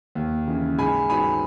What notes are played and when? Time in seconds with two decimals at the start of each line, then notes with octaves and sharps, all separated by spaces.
0.15 D#2
0.47 C#3 E3
0.78 G#2 G#5 B5
1.09 F#3 B3 D#4 G#5 B5